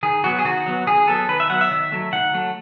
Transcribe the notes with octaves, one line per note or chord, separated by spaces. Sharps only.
D#3 G#4
F#3 B3 F#4
G#4
D#3 F#4
F#3 B3
D#3 G#4
F#3 B3 A4
D#3 B4
E5
F#3 B3 F#5
E5
D#3
F#3 A3
D#3 F#5
F#3 A3